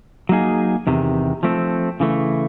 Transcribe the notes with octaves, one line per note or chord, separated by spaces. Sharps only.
F#3 A#3 D#4 G#4
E2 C3 D#3
F3 A3 C4
C#3 E3 A3